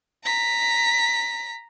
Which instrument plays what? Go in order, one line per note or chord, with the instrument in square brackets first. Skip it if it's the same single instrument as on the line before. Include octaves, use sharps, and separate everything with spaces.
[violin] A#5 B6